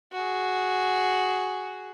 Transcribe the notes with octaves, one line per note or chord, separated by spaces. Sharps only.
F#4 G#4